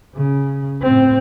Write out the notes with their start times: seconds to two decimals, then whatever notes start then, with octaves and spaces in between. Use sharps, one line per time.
0.15 C#3
0.82 A2 C4